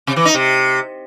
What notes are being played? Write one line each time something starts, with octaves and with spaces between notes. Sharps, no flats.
C3
E3
D#4
C3